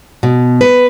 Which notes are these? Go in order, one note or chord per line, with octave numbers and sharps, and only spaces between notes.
B2
B4